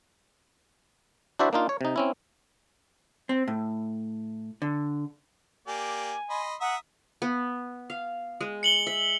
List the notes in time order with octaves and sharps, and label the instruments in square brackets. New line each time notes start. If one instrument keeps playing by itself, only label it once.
[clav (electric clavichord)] D4 E4 F#4 C5 D5 E5
A#3 D4 D#4 F4
C#5
C3 D#4
C4 C#4 E4
[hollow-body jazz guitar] C4
A2
D3
[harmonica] A#3 G4 D5 [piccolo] G#5
[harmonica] D#5 B5 C6
[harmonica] E5 A#5 D#6 [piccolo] F#5
[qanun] B3
F5
G#3
[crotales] C#7 F#7 G7
[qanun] E5